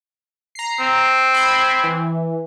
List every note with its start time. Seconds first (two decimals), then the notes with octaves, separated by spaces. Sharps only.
0.55 A#5 C7
0.80 C4
1.34 B5 G#6
1.83 E3